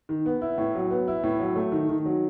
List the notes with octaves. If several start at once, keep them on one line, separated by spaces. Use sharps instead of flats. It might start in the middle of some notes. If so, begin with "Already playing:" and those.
D#3
B3
E4
A2
F#3
B3
E4
A2
F#3
A3
D#3
D#3
F#3